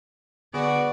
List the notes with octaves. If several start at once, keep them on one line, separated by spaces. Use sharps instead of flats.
D3 B3 F#4 G#4 D5 D7